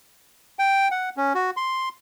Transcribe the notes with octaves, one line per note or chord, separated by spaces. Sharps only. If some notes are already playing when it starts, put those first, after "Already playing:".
G5
F#5
C#4
F#4
C6